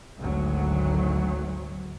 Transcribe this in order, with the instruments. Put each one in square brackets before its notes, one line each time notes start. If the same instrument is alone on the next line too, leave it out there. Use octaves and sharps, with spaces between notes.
[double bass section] G#1 D2 F#3